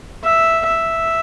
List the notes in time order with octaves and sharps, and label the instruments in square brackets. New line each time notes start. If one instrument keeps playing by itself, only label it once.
[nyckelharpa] E5
E5